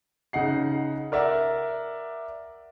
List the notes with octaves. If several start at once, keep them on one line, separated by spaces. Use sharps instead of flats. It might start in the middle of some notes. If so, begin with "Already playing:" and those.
C#3 D#4 F#5 C7
A#4 D5 E5 F#5